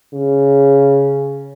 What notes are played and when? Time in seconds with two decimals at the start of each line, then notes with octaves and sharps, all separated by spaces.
0.14 C#3